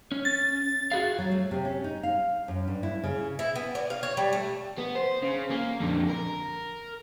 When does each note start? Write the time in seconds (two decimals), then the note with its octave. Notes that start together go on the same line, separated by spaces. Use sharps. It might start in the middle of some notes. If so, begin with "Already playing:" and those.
0.12 C#4
0.25 A6
0.92 F#4 G#4 F5
1.19 F#3
1.31 A3
1.51 C3
1.65 C#4
1.84 D#4
2.03 F5
2.48 F#2
2.68 G2
2.83 E4
3.04 C#3
3.39 E4
3.56 B3
3.75 D5
3.90 F5
4.03 C#5
4.17 G3
4.33 A3
4.78 B3
4.95 C5
5.22 C#3
5.50 A#3
5.80 F2 D3
6.10 A#4